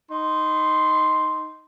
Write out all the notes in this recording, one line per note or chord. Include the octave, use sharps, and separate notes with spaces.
D#4 C6